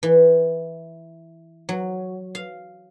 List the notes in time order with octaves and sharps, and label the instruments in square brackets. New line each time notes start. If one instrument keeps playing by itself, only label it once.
[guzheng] E3
F#3
F5